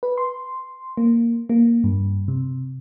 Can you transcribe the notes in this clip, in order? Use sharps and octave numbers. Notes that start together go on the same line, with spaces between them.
B4
C6
A#3
A#3
G2
C3